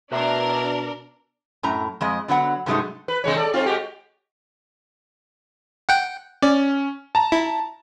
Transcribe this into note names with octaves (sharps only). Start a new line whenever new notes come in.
B2 D4 A#4 B4 E5 A#5
F#2 A2 A#5
F2 G#3 D#5
D3 F#3 B3 F#5
G2 C3 F#3 G#3 A3 D#4
B4
C3 G#3 C#5
A4 D5
G#2 C4 F4
G#3 F#4 G4
F#5 G5
C#4 D5
A5 A#5
E4